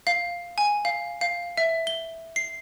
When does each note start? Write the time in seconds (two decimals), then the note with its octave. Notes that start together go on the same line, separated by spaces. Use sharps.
0.07 F5
0.58 G#5
0.85 F5
1.21 F5
1.57 E5
1.87 G7
2.36 C7